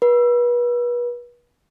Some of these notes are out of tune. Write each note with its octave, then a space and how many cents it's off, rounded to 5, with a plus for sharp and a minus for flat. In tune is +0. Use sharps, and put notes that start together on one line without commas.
B4 -35